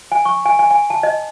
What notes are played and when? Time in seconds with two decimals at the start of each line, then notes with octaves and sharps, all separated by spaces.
0.12 G#5
0.25 C#6
0.46 G#5
0.59 G#5
0.71 G#5
0.90 A5
1.03 D#5